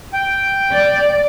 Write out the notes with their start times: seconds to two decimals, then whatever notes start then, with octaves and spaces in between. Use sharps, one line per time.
0.13 G5
0.73 D5